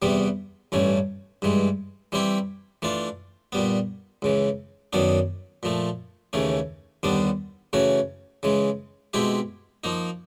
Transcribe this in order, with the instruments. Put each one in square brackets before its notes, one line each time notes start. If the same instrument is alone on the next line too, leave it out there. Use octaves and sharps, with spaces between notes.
[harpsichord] E2 C3 E3 G3 B3
A1 G2 E3 A3 C#4
G2 E3 G#3
E3 G3 C4 E4 G4
E3 A3 D4 F4
A#2 G3 B3
C#2 C#3 E3
F#2 D#3 F#3 B3 D4
A#2 F3 A3
D#2 C#3 E3 A3 C#4
D#2 D3 G3 B3 D4
C#3 E3 A3 C#4 F#4
C#3 E3 G#3
B2 G#3 C4 E4 G4
F3 A#3 D#4